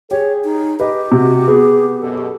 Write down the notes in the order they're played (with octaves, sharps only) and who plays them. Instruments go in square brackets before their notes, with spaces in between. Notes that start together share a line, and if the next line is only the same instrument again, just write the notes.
[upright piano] G4 [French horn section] G#4 [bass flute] C#5
[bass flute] D#4
[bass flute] G4 [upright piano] B4 D#5
[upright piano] C3 [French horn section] F#4
[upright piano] B3 [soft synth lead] G#4
[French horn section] F#2 B2 [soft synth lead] A4